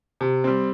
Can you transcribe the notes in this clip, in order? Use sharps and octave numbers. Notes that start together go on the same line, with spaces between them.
C3
G3 C4